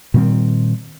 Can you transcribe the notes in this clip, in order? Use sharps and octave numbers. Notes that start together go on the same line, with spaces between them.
A#2 D#3 G3 C4